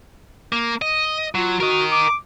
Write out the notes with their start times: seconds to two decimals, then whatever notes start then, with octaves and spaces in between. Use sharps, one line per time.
0.53 A#3
0.82 D#5
1.35 F#3 F4
1.60 F#4 A#4 D#5
1.92 D6